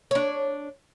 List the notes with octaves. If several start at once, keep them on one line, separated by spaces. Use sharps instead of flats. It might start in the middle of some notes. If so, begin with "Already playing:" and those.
D4 C#5